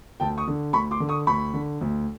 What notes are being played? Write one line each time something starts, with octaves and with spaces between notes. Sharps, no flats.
D2 G5 A5
C#6 D#6
D3
D2 B5 C#6
C6 D6
D3
C#6 D#6
D2 B5 C#6
D3
D2